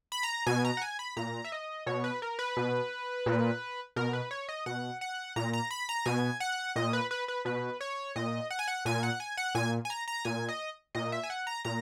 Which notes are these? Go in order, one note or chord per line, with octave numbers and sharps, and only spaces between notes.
B5
A#5
B2 G#5
A#5
F#5
G#5
B5
A#2 A#5
E5
D#5
B2 C#5
B4
A#4
B4
B2
A#2
B2 A#4
B4
C#5
D#5
B2 F#5
F#5
A#2 A#5
A#5
B5
A#5
B2 G#5
F#5
A#2 D#5
B4
B4
B4
B2 B4
C#5
A#2 D#5
F#5
G#5
F#5
A#2 G#5
F#5
G#5
F#5
A#2 G#5
G#5
A#5
A#5
A#2 G#5
D#5
A#2 D#5
E5
G#5
F#5
A#5
A#2 A#5